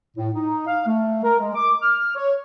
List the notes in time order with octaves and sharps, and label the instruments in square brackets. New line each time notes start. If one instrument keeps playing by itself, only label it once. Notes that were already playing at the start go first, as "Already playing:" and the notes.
[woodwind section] A2
D#4
F5
A3
A#4
G#3
D6
F6
C#5